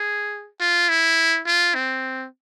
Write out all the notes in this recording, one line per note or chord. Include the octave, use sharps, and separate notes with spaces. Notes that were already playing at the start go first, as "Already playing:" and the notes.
Already playing: G#4
F4
E4
F4
C4